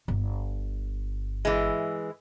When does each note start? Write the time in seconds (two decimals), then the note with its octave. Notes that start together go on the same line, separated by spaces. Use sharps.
0.08 G1
1.45 E3 G#3